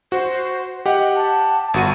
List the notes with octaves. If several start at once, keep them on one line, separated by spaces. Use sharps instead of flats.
F#4 C5
G4 D#5 F#5
A5
G1 F#4 D#7